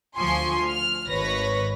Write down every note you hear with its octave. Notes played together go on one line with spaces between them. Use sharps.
D2 F3 G#5 C6 C#6
F6
G#1 B4 C#5 A#6